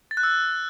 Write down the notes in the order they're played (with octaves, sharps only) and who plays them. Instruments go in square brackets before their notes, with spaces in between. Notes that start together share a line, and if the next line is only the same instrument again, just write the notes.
[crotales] A6
F#6
E6